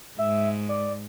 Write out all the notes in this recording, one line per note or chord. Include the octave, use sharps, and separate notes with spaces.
G#2 E5
D5